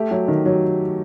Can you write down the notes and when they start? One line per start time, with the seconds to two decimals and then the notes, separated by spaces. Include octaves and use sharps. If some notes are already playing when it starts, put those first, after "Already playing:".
Already playing: A3 G4
0.11 F#3
0.28 D#3
0.46 F#3